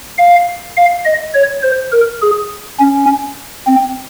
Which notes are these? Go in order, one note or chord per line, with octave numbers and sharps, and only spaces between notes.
F5
F5
D#5
C#5
C5
A#4
G#4
C#4
C4